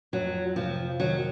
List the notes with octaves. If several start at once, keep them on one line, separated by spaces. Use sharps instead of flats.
F2 F#3
C3 F3
D#3 F#3